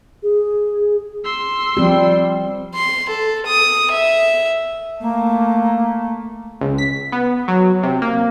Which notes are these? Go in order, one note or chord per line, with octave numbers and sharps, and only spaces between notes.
G#4
C6 E6
F3 G3 C4 G4
C6
A4
D#6
E5
A3 A#3
C#2
B6
B3
F#3
C3
A#3